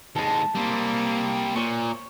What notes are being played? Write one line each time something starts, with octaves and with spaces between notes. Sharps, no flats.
D#2 G#3 A5 B5
G3 A#3 C4
A#2 C5 C#5 C#6